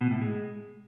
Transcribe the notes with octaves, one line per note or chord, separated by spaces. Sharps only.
B2
A2
G#3